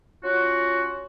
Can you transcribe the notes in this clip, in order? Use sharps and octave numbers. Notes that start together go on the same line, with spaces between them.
C#4 F4 F#4